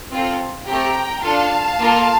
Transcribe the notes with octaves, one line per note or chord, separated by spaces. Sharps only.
C4 F4 A4
A3 C4 G4 G5 A#5
D4 F4 A4 F5 A5
A#3 F4 A4